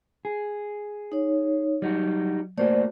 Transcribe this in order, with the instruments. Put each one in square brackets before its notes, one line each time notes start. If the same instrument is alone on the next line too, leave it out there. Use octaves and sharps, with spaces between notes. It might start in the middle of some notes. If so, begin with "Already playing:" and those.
[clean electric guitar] G#4
[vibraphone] D#4 C#5
[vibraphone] F#3 [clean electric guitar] G3 D#4 F#4
[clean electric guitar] A3 A#3 F#4 [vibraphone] C5 D5